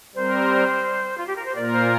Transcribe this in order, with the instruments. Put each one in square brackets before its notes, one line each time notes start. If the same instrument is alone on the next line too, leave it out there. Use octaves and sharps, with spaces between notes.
[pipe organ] G3 C4 A#4 [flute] C5
[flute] F4
G4
A#4
C5
[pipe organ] A#2 A#3 F4 A#4 [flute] D5
[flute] C5